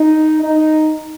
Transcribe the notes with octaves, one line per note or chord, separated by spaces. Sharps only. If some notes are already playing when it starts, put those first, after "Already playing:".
Already playing: D#4
D#4